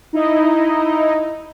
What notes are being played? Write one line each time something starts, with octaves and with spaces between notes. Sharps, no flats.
D#4 E4 D#5